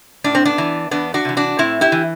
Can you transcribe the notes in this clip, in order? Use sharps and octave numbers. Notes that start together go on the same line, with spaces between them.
A2 D4
C4
B3 D4
E3
E2 B3 D4
D4 F#4
C3 E3
D4 F#4
A2 C4 E4
E4 G4
E3